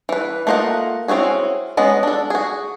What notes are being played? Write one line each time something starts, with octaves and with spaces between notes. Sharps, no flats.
E3 B4
A3 A#3 F4 D#5 F#5
C4 C#4 E4 F#4 G#4
G#3 B3 C#4 D#5
D4 A4
F#4 G#4